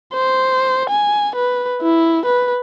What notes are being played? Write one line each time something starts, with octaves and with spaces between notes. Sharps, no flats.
C5
G#5
B4
E4
B4